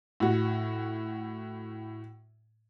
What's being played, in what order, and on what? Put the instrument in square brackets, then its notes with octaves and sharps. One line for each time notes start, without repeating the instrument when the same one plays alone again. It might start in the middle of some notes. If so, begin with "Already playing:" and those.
[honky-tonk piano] A2 F#4